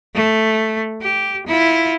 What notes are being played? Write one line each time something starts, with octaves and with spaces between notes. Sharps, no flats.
A3
G4
E4 F4